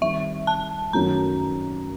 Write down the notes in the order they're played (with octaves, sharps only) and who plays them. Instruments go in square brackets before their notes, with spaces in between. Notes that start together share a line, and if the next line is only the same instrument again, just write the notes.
[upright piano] D#3 G3 C4 [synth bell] E5
[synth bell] A5
[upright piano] F#2 D#3 F#3 A3 [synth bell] A#5